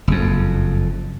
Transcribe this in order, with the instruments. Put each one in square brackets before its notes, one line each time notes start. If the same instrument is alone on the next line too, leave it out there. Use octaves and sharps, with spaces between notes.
[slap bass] F#1 F2